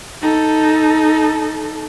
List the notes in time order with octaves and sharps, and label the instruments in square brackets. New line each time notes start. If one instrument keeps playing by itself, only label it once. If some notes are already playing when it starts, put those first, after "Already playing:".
[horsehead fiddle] D#4 A4